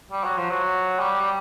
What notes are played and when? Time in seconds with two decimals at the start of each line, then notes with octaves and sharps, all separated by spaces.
0.12 G3
0.24 F#3
0.37 F3
0.50 F#3
1.00 G3
1.20 G3